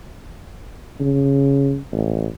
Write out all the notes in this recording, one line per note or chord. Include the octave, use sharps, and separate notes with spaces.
C#3
A1